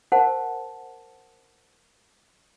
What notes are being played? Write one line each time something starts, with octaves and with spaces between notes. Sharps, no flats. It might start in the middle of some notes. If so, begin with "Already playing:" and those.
A#4 C5 F#5 A5